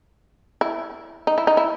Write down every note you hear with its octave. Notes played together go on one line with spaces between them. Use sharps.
E4
D#4
E4
D#4
E4